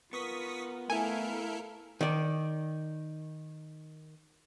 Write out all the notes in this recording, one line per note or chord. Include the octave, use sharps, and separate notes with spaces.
B3 F4 A#4 C#6 D#6 B6
A3 E4 A4 A#4 F5 G#5
D#3 D5